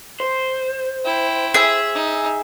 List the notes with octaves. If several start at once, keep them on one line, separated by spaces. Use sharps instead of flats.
C5
E4 G5
G#4 E5
D#4